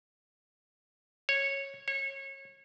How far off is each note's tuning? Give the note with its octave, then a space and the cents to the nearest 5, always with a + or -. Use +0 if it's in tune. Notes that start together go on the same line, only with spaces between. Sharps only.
C#5 -10
C#5 -25